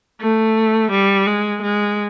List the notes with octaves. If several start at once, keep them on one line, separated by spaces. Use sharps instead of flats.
A3
G3
G#3
G#3